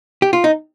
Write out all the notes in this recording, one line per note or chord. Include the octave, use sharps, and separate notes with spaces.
G4
F4
D#4